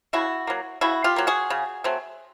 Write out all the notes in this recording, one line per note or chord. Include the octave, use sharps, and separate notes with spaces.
C#3 E4 F#4
F#3 A#3
C#3 E4 F#4
F4 G4
F#3 A#3
F#4 G#4
C#3
F#3 A3 C4